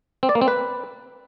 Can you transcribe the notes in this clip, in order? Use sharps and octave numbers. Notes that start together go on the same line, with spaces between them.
C4
D5
A#3
C4
B4